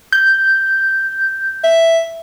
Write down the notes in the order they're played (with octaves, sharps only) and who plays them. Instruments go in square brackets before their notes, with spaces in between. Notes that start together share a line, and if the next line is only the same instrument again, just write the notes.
[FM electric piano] G6
[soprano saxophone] E5